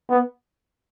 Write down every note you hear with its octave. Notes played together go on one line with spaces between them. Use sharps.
B3